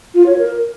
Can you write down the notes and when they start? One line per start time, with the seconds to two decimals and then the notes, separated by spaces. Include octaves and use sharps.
0.15 F4
0.26 C#5
0.38 A#4